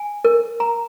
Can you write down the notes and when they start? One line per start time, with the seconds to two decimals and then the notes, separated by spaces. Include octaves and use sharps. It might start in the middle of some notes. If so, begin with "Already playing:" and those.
Already playing: G#5
0.25 A#4
0.60 A#5